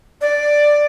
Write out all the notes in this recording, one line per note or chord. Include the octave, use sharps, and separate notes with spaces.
D5